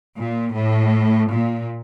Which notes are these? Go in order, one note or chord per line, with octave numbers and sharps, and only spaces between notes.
A#2
A2
A#2